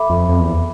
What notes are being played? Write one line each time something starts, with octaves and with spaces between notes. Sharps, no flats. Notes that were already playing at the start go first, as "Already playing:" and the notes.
Already playing: A4 E5 B5 D6
F2
F2
E2